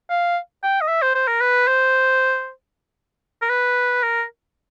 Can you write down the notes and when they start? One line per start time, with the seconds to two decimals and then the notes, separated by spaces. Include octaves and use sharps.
0.10 F5
0.63 G5
0.81 D#5
0.88 E5
1.02 C5
1.15 C5
1.28 A#4
1.41 B4
1.68 C5
3.42 A#4
3.50 B4
4.03 A#4